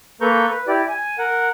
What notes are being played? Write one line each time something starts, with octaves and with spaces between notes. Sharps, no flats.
A#3 A4 B4 A#5 C#6 G6
B4
E4 G4 D5
G#5
A#4 F#5